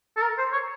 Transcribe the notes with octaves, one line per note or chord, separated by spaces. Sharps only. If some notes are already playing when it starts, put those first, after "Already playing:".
A4
A#4
C5
C#5